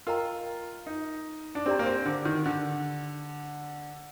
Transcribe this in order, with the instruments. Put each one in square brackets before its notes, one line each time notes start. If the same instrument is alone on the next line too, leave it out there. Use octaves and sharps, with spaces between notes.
[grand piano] F4 [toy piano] A#4 D#5 G5 A#5
[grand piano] D#4
D4
[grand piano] C4 [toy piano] D4 G4 D5 G5 A#5
[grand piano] A#3
C4
D3
D#3
D3